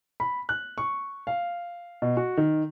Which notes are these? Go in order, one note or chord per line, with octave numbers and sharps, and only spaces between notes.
B5
F#6
C#6
F5
B2
F#4
D#3